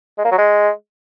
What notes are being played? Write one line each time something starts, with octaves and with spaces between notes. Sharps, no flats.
G#3
A#3
F#3
G#3